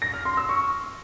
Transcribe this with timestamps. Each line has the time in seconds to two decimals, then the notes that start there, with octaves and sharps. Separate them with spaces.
0.02 A#6
0.14 F6
0.25 C6
0.37 E6
0.49 C#6